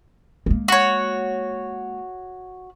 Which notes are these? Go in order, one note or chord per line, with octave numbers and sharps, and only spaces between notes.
G#3 A#3
F#4 C#5